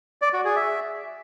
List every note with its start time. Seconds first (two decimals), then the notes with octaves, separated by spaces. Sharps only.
0.22 D5
0.33 F#4
0.45 G#4
0.56 E5